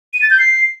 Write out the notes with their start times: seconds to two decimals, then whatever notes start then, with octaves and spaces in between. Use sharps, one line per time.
0.14 D#7
0.22 A6
0.30 G6
0.39 C7